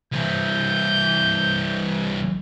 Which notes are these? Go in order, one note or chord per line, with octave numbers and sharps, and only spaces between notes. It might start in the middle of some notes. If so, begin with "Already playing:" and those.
C2 E3 G6